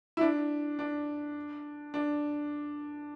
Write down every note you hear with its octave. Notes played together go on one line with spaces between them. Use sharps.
E4
D4
D4
D4